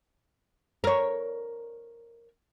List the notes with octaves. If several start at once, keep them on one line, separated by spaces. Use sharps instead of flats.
A#4 C#5